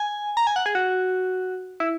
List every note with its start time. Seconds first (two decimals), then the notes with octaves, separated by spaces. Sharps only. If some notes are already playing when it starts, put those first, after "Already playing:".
Already playing: G#5
0.37 A#5
0.47 G#5
0.56 F#5
0.66 G#4
0.75 F#4
1.80 E4